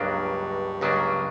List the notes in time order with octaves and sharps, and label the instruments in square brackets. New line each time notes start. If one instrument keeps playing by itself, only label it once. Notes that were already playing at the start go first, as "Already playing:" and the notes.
Already playing: [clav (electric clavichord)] C#2 C#3 F#3 A#3 D4 [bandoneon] G2
[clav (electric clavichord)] C#2 C#3 F#3 A#3 D4